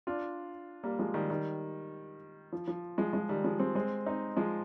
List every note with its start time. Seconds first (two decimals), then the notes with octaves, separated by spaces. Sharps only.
0.07 D4 F4
0.83 G3 A#3
0.99 F3 G#3
1.14 D#3 G3
1.30 D#3 G3
2.52 F3
2.68 F3
2.98 F3 G#3
3.13 F3 G#3
3.29 D#3 G3
3.44 F3 G#3
3.60 G#3 C4
3.75 G#3 C4
4.06 C4 D#4
4.37 F3 G#3